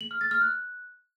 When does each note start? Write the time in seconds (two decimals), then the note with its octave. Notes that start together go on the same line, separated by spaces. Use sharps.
0.01 F#7
0.11 F6
0.21 A6
0.31 F6
0.41 F#6